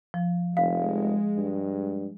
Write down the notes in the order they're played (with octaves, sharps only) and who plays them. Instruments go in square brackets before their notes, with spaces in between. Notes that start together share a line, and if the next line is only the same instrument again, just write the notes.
[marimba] F3
[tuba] F1 [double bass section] G#3 [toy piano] F5
[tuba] G2